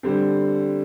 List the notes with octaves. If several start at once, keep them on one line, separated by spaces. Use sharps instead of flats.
D3 G3 C4